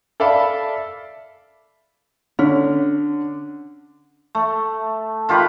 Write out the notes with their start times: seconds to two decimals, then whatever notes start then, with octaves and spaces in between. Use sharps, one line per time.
0.20 A4 D5 E5 F5 A5 B5
2.39 D3 C#4
4.35 A3
5.29 D#3 F4 G4 B4